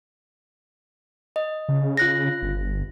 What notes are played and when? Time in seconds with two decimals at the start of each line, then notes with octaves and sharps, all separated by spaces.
1.36 D#5
1.69 C#3
1.97 F4 F#6 A#6
2.42 G1